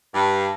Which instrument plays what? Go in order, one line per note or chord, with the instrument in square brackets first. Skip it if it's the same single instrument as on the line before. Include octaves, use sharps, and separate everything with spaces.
[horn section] G2